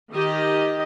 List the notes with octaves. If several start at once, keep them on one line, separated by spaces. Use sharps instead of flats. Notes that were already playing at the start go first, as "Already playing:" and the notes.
D#3 G4 D#5